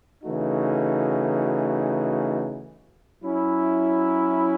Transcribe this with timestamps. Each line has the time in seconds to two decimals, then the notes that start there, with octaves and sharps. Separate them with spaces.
0.23 C#3 E3 A3 D#4 F#4
3.21 F#3 C#4 E4